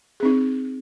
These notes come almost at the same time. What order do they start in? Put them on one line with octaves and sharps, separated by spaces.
G#4 C4 D#4